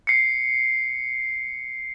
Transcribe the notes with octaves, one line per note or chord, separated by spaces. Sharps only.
C7 C#7